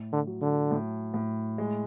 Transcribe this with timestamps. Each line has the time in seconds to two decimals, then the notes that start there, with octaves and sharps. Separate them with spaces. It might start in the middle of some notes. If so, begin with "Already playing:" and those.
Already playing: A2
0.12 D3
0.27 F#3
0.41 D3
0.71 A2
1.14 A2
1.58 G#3